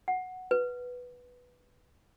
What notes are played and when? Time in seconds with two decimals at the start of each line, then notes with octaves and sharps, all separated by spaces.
0.08 F#5
0.51 B4